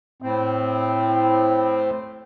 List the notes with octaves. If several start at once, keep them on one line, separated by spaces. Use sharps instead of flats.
A2 C4